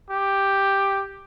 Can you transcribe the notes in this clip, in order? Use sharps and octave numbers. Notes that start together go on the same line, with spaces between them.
G4